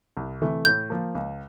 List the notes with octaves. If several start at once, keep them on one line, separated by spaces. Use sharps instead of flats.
C2
C3 E3 A3
A2 G6
F3 A#3
C#2